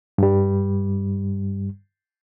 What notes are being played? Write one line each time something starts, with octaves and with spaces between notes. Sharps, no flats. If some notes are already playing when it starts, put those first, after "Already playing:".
G2 G3